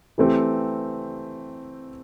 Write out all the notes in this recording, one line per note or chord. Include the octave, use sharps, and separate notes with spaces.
E3 A3 C4 G4